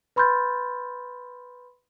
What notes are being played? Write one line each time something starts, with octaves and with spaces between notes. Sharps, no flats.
B4 B5 C6 F6 G6 A6